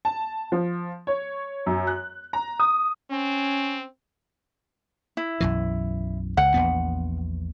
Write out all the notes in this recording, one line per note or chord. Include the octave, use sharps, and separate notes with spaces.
A5
F3
C#5
F#2
F#6
A#5
D#6
C4 C#4
E4
B1 F#2 E3
C#2 F#5
A#1 E2 B3